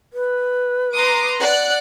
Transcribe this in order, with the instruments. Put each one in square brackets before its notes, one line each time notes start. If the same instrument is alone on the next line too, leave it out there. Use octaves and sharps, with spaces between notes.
[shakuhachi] B4
[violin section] A#5 C6 D6 [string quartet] D#6
[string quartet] D5 F#5 [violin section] F#6